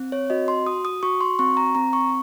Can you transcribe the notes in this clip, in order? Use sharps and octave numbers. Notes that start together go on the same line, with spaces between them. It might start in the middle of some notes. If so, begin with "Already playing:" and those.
Already playing: C4
C#5
F#4 D#5
C6
F#4 D#6
D#6
F#4 C#6
C6
C4 C#6
A#5
C4 A#5
C#6